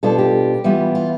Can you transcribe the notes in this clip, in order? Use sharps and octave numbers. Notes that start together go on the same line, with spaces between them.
B2 G3 D4 F4 A4
G4
E3 G3 B3 F4
F4